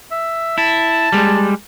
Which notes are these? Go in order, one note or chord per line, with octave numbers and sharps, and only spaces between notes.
E5
E4 A5
G3 G#3